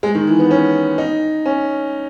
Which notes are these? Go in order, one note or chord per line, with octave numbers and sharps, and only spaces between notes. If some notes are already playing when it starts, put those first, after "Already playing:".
G#3
D#3
E3
B3
C#4
D#4
C#4